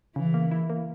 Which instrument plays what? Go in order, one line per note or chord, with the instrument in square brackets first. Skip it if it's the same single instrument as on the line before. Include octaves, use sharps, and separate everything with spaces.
[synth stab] C#3 [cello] E3
[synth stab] A#3
E4
A#3